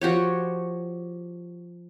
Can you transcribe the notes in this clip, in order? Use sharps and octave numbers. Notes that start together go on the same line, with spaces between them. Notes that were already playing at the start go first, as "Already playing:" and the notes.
F3 F#4 G4 C#5